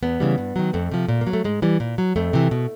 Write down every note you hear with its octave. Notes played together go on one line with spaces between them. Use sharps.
E2 B3
C#3 E3 G3
G2
D#3 F#3
F2 A3
C3 F3
A#2
A#3
F#3
A3
G#2 G#3
E3 G3
A#2
F#3
F2 A3
C3 E3
B2